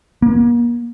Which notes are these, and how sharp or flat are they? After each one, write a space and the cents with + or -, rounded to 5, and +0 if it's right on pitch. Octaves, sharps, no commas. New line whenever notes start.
A#3 +35